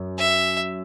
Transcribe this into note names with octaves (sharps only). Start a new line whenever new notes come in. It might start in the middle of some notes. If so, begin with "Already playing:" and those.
Already playing: F#2
E5